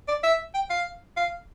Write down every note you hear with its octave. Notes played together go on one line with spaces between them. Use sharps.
D5
E5
G5
F5
F5